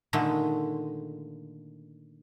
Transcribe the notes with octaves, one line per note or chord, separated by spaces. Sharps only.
A#2 D3 D#3 G#3 A3